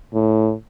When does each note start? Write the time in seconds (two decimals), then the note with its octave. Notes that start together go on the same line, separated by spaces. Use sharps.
0.14 A2